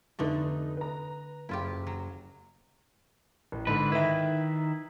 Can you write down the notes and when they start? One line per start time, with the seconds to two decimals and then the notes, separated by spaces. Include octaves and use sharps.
0.19 F1 D3 A3 D4 D#4 B4
0.77 B4 A#5
1.49 F#1 E4 F4 G4
1.87 F#3
3.52 A1
3.67 G#2 D3 B4
3.92 D#3 E4 B4 E5